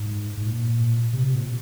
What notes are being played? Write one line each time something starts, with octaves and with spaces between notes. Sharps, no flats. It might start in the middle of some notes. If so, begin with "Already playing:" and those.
Already playing: G#2
G#2
A#2
C3
C3
A#2